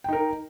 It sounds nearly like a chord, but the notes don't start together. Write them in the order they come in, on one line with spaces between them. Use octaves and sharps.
G5 D#4 A#4